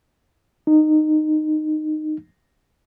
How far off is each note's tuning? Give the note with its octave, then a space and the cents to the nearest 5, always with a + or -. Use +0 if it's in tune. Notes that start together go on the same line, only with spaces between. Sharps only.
D#4 -15